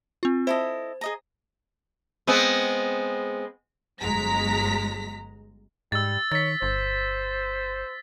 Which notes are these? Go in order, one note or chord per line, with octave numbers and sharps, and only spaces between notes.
C4 F4
E4 A4 C5 D#5
G#4 D#5 A#5
G#3 B3 C4
G1 F#3 G#3 A#5 B6
G#2 G3 E6 A6
D#3 C#5 A6 B6
G1 C5